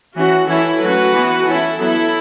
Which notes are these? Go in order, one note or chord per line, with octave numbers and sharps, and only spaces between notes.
E3 C#4 F#4
E3 C#4 E4 A4
F#3 A3 C#4 F#4 B4
E3 B3
E3 C#4 E4 A4
F#3 B3 E4 A4